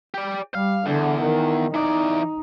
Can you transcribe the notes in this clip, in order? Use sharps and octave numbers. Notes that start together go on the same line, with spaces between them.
G4 D5
G3 F5
E2 D3
D#3
E3 D#4 D5